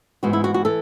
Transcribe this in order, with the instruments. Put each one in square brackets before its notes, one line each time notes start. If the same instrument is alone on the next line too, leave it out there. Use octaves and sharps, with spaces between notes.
[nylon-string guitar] G#2 E3 B3 F#4
E4
F#4
F#4
E3 A4